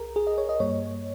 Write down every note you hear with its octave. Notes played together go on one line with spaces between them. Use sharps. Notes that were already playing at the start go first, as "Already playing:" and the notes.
Already playing: C2 G#4 A#4
G#4
D#5
C#5
D#5
G2 G3 A#3 C#5